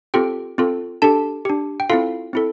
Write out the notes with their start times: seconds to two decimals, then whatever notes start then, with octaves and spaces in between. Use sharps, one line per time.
0.14 C4 F4 G4 A4 G5
0.58 C4 F4 A4
1.02 D4 G4 A4 A5
1.45 D4 G4
1.80 G5
1.90 C4 E4 F4 A4 F5
2.33 C4 E4 A4